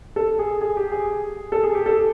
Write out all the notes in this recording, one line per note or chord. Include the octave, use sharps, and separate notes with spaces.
A4
G#4
G#4
G4
G#4
A4
G#4
G4
A4